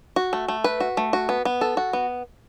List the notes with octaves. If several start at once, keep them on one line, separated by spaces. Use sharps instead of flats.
F#4
A3
A3
B4
F#4
A3
F#4
B3
B3
A4
F#4
B3